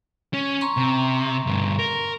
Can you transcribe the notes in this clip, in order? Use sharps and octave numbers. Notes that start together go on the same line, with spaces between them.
C#4
A#5 C6 C#6
C3
D2 G2
A#4